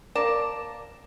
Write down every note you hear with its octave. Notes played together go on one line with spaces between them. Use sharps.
A#3 A#4 D5 A5